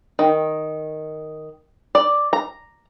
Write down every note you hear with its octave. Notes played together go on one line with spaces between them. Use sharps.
D#3
D5
A#5